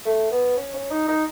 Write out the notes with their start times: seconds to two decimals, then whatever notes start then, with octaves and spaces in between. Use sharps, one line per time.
0.05 A3
0.31 B3
0.57 C#4
0.74 C#4
0.91 D#4
1.08 D#4